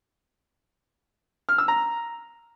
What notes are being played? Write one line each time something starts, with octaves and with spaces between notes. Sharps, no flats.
F6
E6
A#5